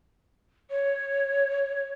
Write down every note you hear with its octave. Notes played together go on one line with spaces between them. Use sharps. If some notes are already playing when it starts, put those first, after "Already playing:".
C#5